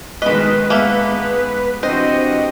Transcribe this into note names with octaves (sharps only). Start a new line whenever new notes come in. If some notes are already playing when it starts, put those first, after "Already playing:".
B2 D#3 G#3 B4 D#5 B5
G#2 G#3 A#3 B3 A4 E5
E3 C4 D4 F#4 G4 C5 D#5